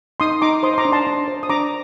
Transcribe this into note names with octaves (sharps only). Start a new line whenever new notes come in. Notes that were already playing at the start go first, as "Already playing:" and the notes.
D#4 C6 D#6
D#4 A#5 D6
C5 C6 D#6
C6
A#5 D6
D4
A5 C6
D4
C5
D#6
D4 A#5 D6